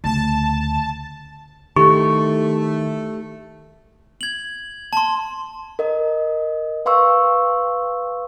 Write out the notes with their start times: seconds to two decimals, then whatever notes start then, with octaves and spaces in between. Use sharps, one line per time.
0.04 D2 C#3 A5
1.76 D#3 A3 E4 G4 C#6
4.21 G#6 F#7
4.93 A5 C6
5.79 A#4 D#5
6.86 B4 F5 C6 C#6 E6